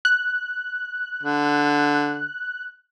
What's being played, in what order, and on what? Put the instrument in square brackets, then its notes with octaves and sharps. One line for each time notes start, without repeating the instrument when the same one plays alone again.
[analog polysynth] F#6
[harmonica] D3